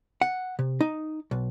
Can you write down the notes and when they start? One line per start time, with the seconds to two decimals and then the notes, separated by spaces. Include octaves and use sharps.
0.21 F#5
0.59 C3
0.81 D#4
1.31 B1